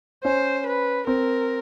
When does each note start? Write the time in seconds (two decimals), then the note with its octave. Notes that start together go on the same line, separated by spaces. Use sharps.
0.24 C#4 C5
0.66 B4
1.07 C4 A#4